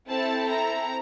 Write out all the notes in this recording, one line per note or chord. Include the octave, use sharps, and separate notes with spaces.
C4 E4 A4 A5
A#5